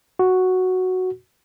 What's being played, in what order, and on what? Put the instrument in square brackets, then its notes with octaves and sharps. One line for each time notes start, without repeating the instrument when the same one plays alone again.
[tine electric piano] F#4